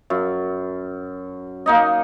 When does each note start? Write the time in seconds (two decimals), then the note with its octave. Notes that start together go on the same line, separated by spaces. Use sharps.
0.10 F#2
1.66 A#3 D#4 D#5